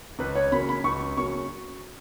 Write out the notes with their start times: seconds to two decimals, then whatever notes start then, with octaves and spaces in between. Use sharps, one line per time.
0.19 C#2 B4
0.36 C#5
0.52 C#3 F#3 A#3 B5
0.69 B5
0.84 C#2 C#6
1.17 C#3 F#3 A#3 C#6